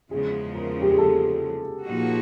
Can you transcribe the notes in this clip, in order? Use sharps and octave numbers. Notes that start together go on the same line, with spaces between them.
E2 C#3 F3 G#3 G#4
A#4
G4
G#4
A4
A#2 F3 A#3 D#4 F#4